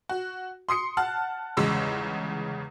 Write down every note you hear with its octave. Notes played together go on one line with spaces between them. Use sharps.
F#4
C6 D#6 C7 C#7
F#5 A5 F6 F#6
G1 E2 C#3 G#3 E6